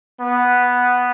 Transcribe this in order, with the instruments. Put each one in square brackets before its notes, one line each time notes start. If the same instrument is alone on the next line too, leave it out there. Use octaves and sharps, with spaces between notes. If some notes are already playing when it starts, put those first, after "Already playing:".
[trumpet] B3